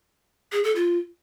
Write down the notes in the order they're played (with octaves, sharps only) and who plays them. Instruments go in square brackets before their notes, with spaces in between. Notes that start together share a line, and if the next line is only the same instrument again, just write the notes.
[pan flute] G#4
A4
F4